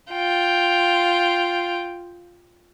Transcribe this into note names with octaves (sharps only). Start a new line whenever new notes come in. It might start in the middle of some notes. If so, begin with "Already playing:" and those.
F4 G5